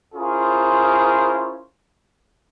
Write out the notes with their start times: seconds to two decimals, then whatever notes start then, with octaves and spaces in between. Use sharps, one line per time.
0.14 C#4 E4 F4 G#4 A#4 C5